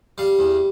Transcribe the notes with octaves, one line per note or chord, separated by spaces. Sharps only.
G3 F5
E2